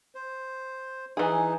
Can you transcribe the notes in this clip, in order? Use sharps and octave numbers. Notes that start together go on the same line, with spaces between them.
C5
E3 D#4 G#4